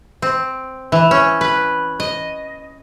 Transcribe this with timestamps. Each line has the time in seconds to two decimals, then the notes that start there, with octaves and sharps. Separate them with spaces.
0.22 C4
0.92 E3
1.11 C#4
1.41 B4
2.00 D#5